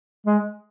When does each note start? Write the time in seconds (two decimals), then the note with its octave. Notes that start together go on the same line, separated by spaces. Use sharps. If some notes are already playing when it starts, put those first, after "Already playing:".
0.27 G#3